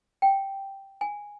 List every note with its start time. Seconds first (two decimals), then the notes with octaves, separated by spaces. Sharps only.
0.22 G5
1.01 G#5